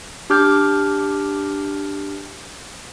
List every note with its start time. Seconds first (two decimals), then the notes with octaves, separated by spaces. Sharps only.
0.30 D4 G4 D6 F6 G6